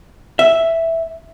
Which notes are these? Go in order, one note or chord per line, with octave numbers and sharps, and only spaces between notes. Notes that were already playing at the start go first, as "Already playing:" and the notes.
E5